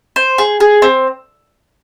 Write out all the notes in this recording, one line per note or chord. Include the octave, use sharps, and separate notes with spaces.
C5
G#4
G#4
C4